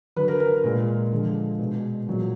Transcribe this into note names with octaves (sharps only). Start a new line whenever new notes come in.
D3 F#3 B4
A#4
A#4
A#2 G#3
D3 F3 G#3
B2 G#3
A#2 F#3